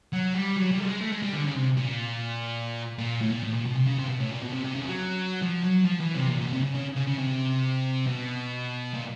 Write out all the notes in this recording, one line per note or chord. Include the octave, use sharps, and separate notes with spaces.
F#3
G3
F#3
G3
A3
G#3
A3
G#3
G3
D3
C#3
C3
A#2
A#2
A2
A#2
A2
A#2
B2
C3
C#3
C3
B2
A2
A#2
B2
C3
C3
C#3
G3
F#3
F3
F#3
F3
E3
C3
A#2
A#2
B2
C3
C#3
C#3
C#3
C#3
C3
B2
A#2